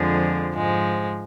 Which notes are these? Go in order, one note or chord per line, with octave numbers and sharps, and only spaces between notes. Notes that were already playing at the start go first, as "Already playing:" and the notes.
Already playing: F2 D3 F3 G#3
G#2 F3 G#3